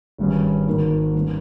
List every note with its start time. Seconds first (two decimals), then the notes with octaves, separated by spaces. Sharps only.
0.18 G#1 G2 G3 C#4
0.66 G#1 G#2 D#3 A#3
1.14 G2 D#3 A#3 C#4